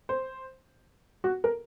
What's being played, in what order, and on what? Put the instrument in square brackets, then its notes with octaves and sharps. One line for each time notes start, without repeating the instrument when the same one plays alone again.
[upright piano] C5
F#4
A#4